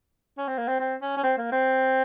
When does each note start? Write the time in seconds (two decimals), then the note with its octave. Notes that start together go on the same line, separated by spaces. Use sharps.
0.38 C#4
0.48 C4
0.58 A#3
0.68 C4
0.80 C4
1.02 C#4
1.17 C#4
1.23 C4
1.38 A#3
1.52 C4